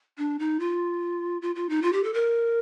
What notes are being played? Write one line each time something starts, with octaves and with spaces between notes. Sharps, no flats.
D4
D#4
F4
F4
F4
D#4
F4
G4
A4
A#4